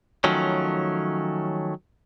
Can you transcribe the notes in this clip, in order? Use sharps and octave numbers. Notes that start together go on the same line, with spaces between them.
D#3 F3 F#3 A3 C#4